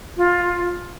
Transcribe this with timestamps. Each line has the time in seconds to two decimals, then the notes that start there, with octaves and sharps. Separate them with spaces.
0.17 F4